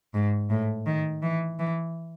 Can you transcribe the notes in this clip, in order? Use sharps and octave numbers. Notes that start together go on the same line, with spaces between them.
G#2
A2
D#3
E3
E3